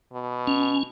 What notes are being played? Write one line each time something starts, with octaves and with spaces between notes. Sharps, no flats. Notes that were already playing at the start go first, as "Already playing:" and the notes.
B2
C#4